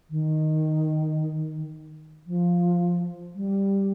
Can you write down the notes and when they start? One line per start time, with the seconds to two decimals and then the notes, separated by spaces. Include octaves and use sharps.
0.10 D#3
2.27 F3
3.35 G3